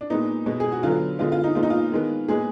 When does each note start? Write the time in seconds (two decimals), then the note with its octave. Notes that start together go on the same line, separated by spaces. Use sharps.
0.01 D4
0.10 A#2 G#3 B3 D#4
0.46 B2 G#3 B3
0.60 G#4
0.72 F#4
0.83 D3 F#3 B3 F4
1.19 D3 G#3 B3 F4
1.32 F4
1.44 D#4
1.55 A#2 G#3 B3 F4
1.63 D#4
1.70 F4
1.92 D#3 G#3 B3
2.28 A#2 G#3 B3 G#4